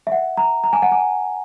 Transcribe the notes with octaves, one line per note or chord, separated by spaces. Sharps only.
E5
F#5
A#5
A#5
G#5
F#5
G#5